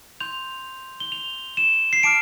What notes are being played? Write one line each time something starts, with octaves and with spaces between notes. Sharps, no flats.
C6 G6 F7
G7
F7
E7
C7
A5 D6 F6 D7